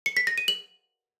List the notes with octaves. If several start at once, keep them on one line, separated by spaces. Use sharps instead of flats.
C#7
B6
A#6
D#7
F#7